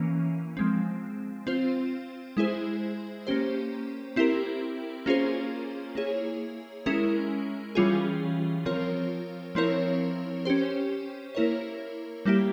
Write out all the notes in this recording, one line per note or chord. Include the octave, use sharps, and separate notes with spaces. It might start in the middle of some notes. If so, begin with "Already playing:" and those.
Already playing: E3 A#3 C#4
F3 G#3 C4
C4 F4 C5
G#3 E4 G#4 C5
A#3 C#4 G4 C5
C4 E4 G4 A#4
A#3 C#4 F4 G#4 C5
A#3 E4 G#4 C#5
G#3 C#4 E4 A#4
E3 G3 C#4 F4 G#4
F3 C4 F4 A#4 C#5
F3 C4 E4 A#4 C#5
C#4 G4 C5
A#3 E4 A#4 C#5
G3 A#3 E4 G4